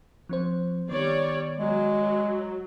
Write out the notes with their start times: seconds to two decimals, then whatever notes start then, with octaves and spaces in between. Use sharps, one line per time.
0.29 F3 C4 C5
0.89 D#3 G3 B3 C#5 D5
1.59 F#3 G#3